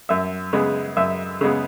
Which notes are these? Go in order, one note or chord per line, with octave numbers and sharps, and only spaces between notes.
F#2 E5
C#3 G#3 B3
F#2 E5
C#3 G#3 B3